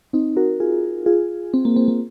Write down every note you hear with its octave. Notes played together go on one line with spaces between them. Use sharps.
C4 D#4
F#4 A#4
F4 G#4
F4 G#4
C4
A#3
C4
A#3